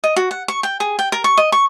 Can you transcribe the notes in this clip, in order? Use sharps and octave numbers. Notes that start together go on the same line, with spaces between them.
D#5
F#4
F#5
C#6
G5
G#4
G5
A#4
C#6
D#5
C#6